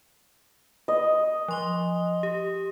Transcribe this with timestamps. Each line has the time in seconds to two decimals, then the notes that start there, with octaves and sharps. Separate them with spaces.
0.88 D#5
1.48 F3 C6 G7
2.23 G4